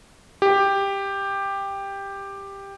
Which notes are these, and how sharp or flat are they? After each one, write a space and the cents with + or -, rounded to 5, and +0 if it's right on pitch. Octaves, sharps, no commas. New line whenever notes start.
G4 +10